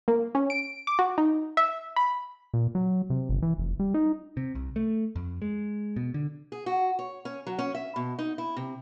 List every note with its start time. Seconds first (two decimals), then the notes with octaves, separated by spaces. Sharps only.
0.08 A#3
0.35 C#4
0.50 D7
0.87 D6
0.99 F#4
1.18 D#4
1.57 E5
1.96 B5
2.54 A#2
2.75 F#3
3.10 C3
3.29 G1
3.42 E3
3.58 F1
3.80 G3
3.94 D#4
4.37 C3
4.55 C2
4.76 A3
5.16 F2
5.42 G#3
5.96 B2
6.14 D3
6.52 G#4
6.66 F#4
6.99 C#5
7.25 C#4
7.47 F#3
7.59 C#4
7.75 E5
7.96 B2
8.19 D#4
8.38 E4
8.56 C3